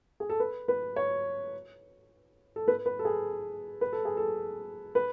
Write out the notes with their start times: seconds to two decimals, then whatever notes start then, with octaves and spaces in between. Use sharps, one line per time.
0.20 G#4
0.30 A4
0.40 B4
0.68 B4
0.96 C#5
2.56 A4
2.68 B4
2.86 B4
2.99 A4
3.05 G#4
3.81 B4
3.93 A4
4.05 G#4
4.17 A4
4.95 B4